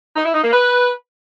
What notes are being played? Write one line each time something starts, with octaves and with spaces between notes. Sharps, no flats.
D#4
E4
D#4
A#3
B4